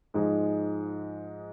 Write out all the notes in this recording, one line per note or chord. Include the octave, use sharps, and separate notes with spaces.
G#2 F3 G#3